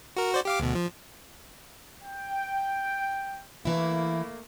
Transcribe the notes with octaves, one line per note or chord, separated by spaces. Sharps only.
F#4 A#4
F#4 C5 D5
G4 F5 D6
D2 B2
F3
G5
E3 A3 A#3 E4